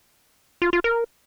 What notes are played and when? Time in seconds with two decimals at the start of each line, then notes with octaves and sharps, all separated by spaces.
0.62 F4
0.73 F4
0.84 A#4